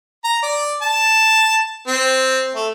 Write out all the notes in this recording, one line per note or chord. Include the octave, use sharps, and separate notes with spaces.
A#5
D5
A5
C4
A3